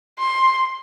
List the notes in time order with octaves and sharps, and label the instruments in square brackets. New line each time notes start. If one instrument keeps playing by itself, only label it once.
[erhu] C6